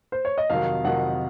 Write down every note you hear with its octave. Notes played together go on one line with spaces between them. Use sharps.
C5
C#5
D#5
F2 C3 D#3 F#3 F5
F2 C3 D#3 F#3 F#5